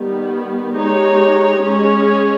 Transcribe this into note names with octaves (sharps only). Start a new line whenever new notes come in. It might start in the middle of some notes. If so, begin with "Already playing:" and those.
Already playing: D#3 G3 B3
G#3 D#4 G4 C#5
G#3 C#4 G#4 C#5